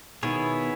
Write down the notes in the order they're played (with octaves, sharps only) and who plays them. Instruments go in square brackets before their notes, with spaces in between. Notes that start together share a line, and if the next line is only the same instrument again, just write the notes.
[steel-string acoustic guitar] B2 D#3 [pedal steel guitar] B3 E4 G#4 C#5